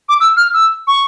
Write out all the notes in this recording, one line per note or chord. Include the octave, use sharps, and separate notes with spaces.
D6
E6
F6
E6
C#6